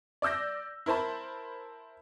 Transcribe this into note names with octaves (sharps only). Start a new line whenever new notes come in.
D5 D6 E6 G6 A#6
E4 A#4 C5 A5 B5